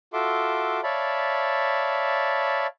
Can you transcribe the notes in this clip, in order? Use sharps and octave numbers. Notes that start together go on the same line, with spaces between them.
F4 F#4 A4 E5 C6 D6
C#5 D5 E5 F5 A5 B5